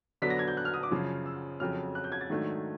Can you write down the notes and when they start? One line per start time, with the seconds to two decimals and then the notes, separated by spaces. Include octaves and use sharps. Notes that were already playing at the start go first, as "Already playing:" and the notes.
0.22 D3 F#3 B3 D4 B6
0.30 A#6
0.39 G#6
0.48 G6
0.57 F#6
0.65 F6
0.74 D#6
0.83 D6
0.91 F#2 C#3 F3
1.26 E6
1.60 F2 C#3 F#3 F6
1.95 F#6
2.04 G6
2.12 G#6
2.21 A6
2.30 G#2 D#3 F#3 A3 D4